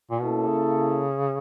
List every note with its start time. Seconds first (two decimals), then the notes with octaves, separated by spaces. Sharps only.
0.11 A#2
0.21 B2 A#3 C#4 E4 A4
0.48 C#3